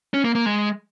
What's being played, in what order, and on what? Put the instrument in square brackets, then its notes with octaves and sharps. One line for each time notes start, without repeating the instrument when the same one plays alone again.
[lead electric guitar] C#4
A#3
A#3
G#3